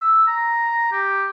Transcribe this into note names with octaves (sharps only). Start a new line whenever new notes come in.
E6
A#5
G4